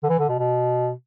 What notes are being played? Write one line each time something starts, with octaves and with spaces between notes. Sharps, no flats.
D3
E3
D3
B2
B2